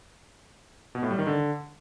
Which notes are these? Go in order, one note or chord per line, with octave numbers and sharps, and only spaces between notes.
B2
A2
G3
D#3
D3